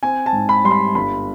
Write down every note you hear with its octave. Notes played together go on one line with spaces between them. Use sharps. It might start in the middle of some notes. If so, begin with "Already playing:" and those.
C4 G#5
A5
G#2
B5
G3 C6
B5
G1 B5